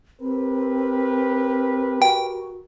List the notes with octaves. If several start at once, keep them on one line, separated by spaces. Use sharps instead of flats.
C4 G4 A#4 B4
F#4 G5